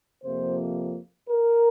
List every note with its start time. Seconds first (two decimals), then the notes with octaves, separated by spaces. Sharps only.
0.24 F2 C3 F3 A#3 C5
1.29 A#4